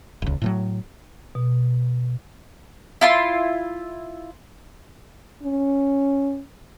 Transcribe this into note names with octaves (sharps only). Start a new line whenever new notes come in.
D#1 C#2
A2 F3 F#3
B2
E4 F4 C6
C#4